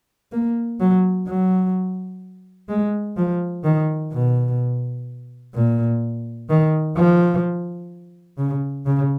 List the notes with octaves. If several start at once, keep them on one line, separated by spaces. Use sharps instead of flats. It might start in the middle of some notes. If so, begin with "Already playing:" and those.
A#3
F#3
F#3
G#3
F3
D#3
B2
A#2
D#3
F3
C#3
C#3